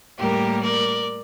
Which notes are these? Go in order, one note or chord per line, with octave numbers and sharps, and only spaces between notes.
A2 G3 A#3 G4 A#4
A#4 D5